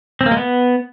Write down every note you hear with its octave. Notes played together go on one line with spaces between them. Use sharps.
C4
A#3
G#3
B3